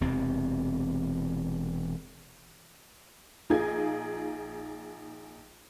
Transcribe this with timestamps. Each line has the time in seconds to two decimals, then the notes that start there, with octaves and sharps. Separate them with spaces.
0.01 E1 E2 C3 C4
3.50 A#1 D#4 F4 G#4 G#6